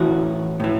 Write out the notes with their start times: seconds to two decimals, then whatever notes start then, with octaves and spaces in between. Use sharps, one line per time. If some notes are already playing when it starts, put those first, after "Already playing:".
Already playing: A2 E3 F#4
0.60 A2 E3